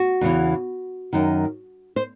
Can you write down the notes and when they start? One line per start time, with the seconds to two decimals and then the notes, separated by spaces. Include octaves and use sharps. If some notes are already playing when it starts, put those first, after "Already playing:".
Already playing: F#4
0.21 E2 C#3 E3
1.13 F#2 D#3
1.96 C5